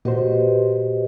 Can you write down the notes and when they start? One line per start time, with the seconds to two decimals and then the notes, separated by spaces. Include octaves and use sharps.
0.05 A#2 F#4 G4 B4 C5 D#5